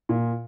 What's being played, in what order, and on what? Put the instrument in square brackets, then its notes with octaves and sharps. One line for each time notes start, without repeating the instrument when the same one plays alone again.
[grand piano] A#2